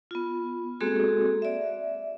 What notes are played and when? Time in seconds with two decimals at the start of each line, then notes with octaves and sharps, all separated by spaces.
0.11 B3 F4
0.80 G#3 A#3 C4 F#4 G#4 A4
1.42 D5 E5